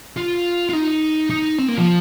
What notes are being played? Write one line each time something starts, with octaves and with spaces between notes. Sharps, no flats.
F4
F4
D#4
D#4
C4
A#3
F3